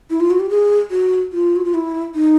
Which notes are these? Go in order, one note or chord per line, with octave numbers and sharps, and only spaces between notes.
E4
F4
F#4
G4
G#4
F#4
F4
F#4
F4
E4
D#4